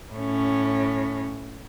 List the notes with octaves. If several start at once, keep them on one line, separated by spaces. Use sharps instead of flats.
A2 C#4